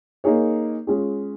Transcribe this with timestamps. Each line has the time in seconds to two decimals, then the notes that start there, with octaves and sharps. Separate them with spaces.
0.24 A#3 D#4 G#4 C#5
0.87 G#3 C#4 F4 G#4